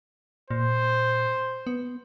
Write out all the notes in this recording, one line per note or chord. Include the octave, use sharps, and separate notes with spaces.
A#2 C5
B3